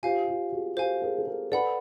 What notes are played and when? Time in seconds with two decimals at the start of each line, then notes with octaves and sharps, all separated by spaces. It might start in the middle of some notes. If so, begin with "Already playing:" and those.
0.03 F4 G4 C5 F5 G#5
0.28 F4 G4
0.52 F#4 G#4
0.77 G4 A4 C5 F5 G#5
1.02 G#4 A#4
1.18 A4
1.27 G#4 A#4
1.52 A4 B4 D5 F#5 B5